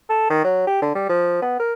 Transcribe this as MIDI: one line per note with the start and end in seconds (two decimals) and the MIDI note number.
0.09 0.25 69
0.30 0.43 51
0.44 0.64 54
0.67 0.80 67
0.82 0.90 50
0.95 1.04 55
1.09 1.37 53
1.42 1.56 59
1.59 1.73 70